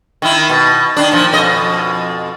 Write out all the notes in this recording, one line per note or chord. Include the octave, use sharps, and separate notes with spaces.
D#3 E4
B2
D#3 D4
A#2 F3
F2 B2 D#5